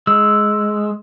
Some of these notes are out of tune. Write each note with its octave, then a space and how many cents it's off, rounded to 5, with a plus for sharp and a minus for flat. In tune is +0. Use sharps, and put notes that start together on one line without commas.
G#3 +10 E6 +0